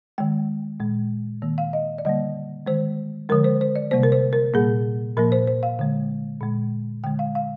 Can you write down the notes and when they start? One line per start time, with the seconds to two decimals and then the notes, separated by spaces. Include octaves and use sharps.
0.18 D#3 G#3 G5
0.80 A#2 G#3
1.42 D#3 A#3
1.58 F5
1.73 D#5
1.98 D5
2.05 D3 G3 A#3 D#5
2.66 D#3 G#3 C5
3.29 D3 F3 G#3 A#4
3.44 C5
3.61 C5
3.76 D5
3.91 C3 G3 A#3 C5
4.03 A#4
4.12 C5
4.33 A#4
4.54 A#2 G3 A#3 G#4
5.17 A#2 F3 A#3 A#4
5.32 C5
5.47 C5
5.63 F5
5.79 D3 G#3
6.41 A#2 G#3
7.04 D3 G#3 G5
7.19 F5
7.35 F5